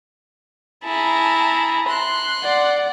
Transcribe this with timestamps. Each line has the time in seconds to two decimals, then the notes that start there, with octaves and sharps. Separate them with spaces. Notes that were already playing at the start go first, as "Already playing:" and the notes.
0.84 E4 G#4 A5 A#5
1.89 C6 F#6
2.43 D5 F#5